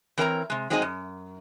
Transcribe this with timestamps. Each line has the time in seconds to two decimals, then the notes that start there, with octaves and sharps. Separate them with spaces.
0.18 E3 C4 A#4 C#5 G5 A#5
0.50 C3 G#3
0.70 F#3 G#3 C4 D#4 G#4 D#5
0.82 F#2